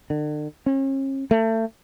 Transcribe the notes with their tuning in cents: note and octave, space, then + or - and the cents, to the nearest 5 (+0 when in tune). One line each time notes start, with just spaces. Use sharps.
D3 +40
C#4 -40
A3 +30